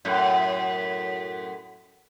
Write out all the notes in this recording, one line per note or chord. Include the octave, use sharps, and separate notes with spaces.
F#2 A2